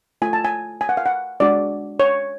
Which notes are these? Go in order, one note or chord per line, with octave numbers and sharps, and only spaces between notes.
A3 F4 G#5
A5
G#5
G#5
F#5
F5
F#5
G#3 D4 F#4 D5
C#5